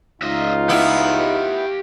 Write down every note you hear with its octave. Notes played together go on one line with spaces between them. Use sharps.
C#2 D#4 F4 D#5 E5
B3 E4 G4 F5